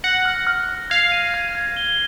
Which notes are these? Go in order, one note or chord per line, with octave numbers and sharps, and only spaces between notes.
F#5 A#6
F6
F6
F6
F5 G#6
D#7
G#6
G#6
G7